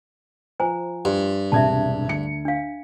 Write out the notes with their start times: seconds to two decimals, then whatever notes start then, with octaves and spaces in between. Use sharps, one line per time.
0.60 F3 C5 G#5 A#5
1.05 G2 C6
1.52 E1 C2 E5 A5 G#6
2.08 D2 C#7
2.45 D4 F5